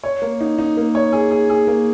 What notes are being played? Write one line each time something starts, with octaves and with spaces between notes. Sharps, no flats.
C#5
A#3
D#4
D#4
A#3
C#5
G#4
G#4
G#4
A#3